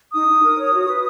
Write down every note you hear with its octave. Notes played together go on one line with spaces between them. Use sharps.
D#4 D#6
D#4
A#4
C#5
F#4
B4